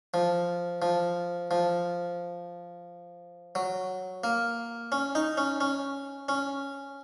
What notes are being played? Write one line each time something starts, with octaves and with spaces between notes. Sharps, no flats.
F3
F3
F3
F#3
A#3
C#4
D#4
C#4
C#4
C#4